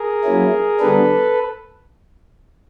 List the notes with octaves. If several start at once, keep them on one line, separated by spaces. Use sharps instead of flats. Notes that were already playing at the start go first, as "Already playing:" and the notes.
Already playing: G#4 A#4
F#3 A#3 C#4 E4
D3 G3 B3 D4 A4 B4